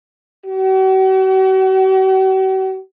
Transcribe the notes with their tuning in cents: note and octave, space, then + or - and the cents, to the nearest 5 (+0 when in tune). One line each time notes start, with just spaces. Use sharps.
F#4 +45